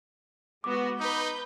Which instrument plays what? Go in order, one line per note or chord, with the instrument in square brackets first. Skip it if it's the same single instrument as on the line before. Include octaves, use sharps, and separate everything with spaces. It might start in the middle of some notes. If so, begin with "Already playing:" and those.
[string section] G#3 B3 F#4 [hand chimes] D6
[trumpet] D#4 [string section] B4 G6